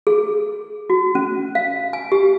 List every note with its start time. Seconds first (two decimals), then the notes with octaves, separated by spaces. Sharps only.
0.07 G#4
0.90 F#4
1.15 C#4
1.55 F5
1.93 G#5
2.12 G4